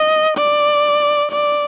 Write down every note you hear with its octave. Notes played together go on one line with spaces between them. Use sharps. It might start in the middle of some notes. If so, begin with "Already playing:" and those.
Already playing: D#5
D5
D5